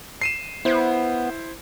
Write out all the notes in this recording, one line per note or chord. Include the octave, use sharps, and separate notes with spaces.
C7 D#7 E7
B3 E4 C5